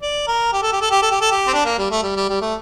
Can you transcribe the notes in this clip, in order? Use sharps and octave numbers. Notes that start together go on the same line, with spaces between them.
D5
A#4
G4
A4
G4
A4
G4
A4
G4
A4
G4
C4
D4
A#3
G3
A3
G3
G3
G3
A3